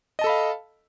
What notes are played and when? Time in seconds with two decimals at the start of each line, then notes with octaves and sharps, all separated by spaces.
0.19 D#5
0.21 A5
0.24 A4
0.27 B5
0.29 F5